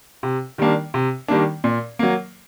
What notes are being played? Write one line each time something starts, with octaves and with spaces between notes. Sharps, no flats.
C3
D#3 G3 A#3 D4
C3
D#3 G3 A#3 D4
A#2
F#3 A#3